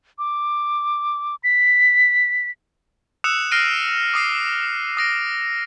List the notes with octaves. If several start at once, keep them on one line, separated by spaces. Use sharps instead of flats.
D6
B6
D#6 E6 F#6 C#7 E7 F7
F6 A#6 C7 D7 D#7
D6 D#6 C7 D#7
D#6 A#6 D7